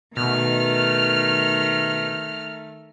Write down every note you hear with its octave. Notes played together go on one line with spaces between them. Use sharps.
B2 D#3 A3 F6